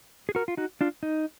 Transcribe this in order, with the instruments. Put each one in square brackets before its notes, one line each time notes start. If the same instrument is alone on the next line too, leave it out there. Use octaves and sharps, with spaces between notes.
[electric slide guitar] G#4
F#4 A#4
F4
D#4 F#4
D4 F4
D#4